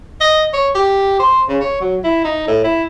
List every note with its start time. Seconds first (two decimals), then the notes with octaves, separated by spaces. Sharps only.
0.21 D#5
0.53 C#5
0.75 G4
1.20 C5
1.48 C#3
1.61 C#5
1.81 F#3
2.04 E4
2.25 D#4
2.48 A2
2.64 E4